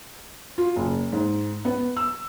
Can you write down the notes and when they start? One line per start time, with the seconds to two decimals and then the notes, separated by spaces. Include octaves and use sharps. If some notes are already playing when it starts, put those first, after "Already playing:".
0.58 F4
0.76 F#1
1.13 G#2
1.65 B3
1.97 E6